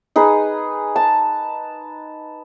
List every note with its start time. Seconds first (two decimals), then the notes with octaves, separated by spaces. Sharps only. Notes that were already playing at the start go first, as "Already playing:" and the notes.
0.16 D#4 G#4 B4
0.96 A5